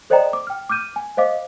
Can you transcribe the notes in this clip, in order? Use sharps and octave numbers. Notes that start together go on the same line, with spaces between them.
A4 C5 D5 D#5 G5 A#5
D6
G5 F6
D6 F6 G6 D#7
G#5
C5 D#5 F5 D6